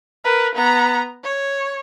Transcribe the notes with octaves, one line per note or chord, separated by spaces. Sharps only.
A#4 B4
B3 A#5
C#5